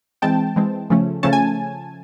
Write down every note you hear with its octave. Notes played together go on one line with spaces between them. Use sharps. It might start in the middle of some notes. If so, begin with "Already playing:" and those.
E3 G#3 C4 G5 A5
E3 G#3 C4
C#3 F3 A3 C#4
C#3 F3 A3 C#4 A5
G#5